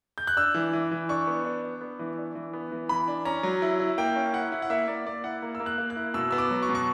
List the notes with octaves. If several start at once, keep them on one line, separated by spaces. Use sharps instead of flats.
G6
F#6
D4 E6
E3
E3
E3
D4 C#6
B3
D4
D4
B3
E3
D4
E3
B3
E3
E3 B5
D4
C#4 A#5
F#3
E4
E4
A#3 G5
C#4
E4 F#5
E4
F#5
A#3 E5
A#3 D5
A#3 D5
E4 F#5
A#3
A#3 E6
F#6
A#3
F#6
E4
B2 E6
B3 E6
D6
F#3
C#6
B2
C#6